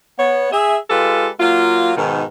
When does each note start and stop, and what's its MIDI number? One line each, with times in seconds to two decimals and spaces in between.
0.18 0.49 59
0.18 0.49 73
0.52 0.77 68
0.52 0.77 76
0.89 1.29 56
0.89 1.29 65
0.89 1.29 67
0.89 1.29 69
0.89 1.29 71
1.40 1.91 54
1.40 1.91 58
1.40 1.91 65
1.96 2.23 44
1.96 2.23 47
1.96 2.23 51